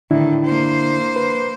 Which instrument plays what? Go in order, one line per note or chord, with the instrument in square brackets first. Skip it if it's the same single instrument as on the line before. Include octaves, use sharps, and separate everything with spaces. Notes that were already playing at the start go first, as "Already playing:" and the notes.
[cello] A2 D#3 [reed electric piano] D3 D4 E4
[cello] A#3 C5
[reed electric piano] B4